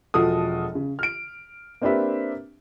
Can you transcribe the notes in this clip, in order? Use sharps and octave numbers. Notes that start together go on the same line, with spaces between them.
E1 F3 F#4 A4 D#6
C#3
F6 D7
A#3 C4 D4 G4 B4 E5